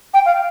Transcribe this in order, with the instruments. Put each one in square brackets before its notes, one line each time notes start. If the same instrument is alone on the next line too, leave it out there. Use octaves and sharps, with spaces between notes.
[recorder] G5
F5